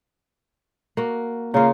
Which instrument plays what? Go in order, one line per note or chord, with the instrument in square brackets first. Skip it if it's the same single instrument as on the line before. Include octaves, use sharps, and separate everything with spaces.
[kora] A#3 F#4
[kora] C#3 F4 [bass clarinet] A#3